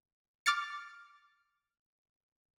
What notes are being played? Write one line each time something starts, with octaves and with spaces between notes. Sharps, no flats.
D6 F6 A6 C#7